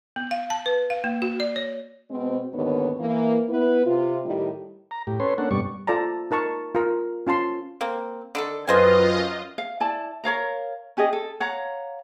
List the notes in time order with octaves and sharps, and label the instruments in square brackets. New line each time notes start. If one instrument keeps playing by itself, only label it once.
[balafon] B3
F5
A5
B4
F5
A#3
F#4
D5
C#5
[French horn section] B2 G#3 C4
D#2 G#2 D3 D#3 B3 C#5
E3 A#3
B3 E4 B4
C3 F4
A2 D#3 G3 E4 G4
[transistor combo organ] A#5
A2 G4
C#4 A4 B4 C#5 C6
A#3 C#4 D4 A4 F#5
G2 B2 G3 D5 C#6
[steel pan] F4 A4 D5 A5 A#5
D#4 A#4 A5 C#6
F4 A#4
C#4 F4 A5 C6
[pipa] A#3 C4
D3 D#3 A4
[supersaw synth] F#2 F4 D#5 [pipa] C4 C5 G#5 [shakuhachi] B4
[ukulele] F5
E4 D5 A5
A#4 C#5 F5 A#5
C#4 G4 G#4 D#5
A4
C#5 F5 F#5 A#5